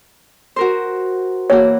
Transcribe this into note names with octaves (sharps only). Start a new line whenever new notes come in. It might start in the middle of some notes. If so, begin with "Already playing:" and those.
F#4 A#4 C5
E3 A#3 F#4 C#5